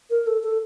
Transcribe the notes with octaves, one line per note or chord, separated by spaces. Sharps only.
A#4
A4
A4